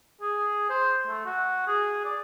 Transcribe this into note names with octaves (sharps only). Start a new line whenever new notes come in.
G#4
C5
A3
F#4
G#4
D5